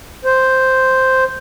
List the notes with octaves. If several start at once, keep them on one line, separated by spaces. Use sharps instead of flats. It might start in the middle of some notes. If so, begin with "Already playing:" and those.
C5